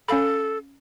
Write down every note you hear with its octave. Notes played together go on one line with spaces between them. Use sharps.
C#4 A4 F5 B5